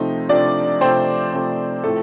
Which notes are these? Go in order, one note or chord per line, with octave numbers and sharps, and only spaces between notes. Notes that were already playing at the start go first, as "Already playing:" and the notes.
Already playing: C3 F3 A3 C4 D#4
C3 F3 A3 C4 D4 D5
C3 F3 A3 C4 C5
C3 F3 A3 C4
A2 F3 A3 C4 A4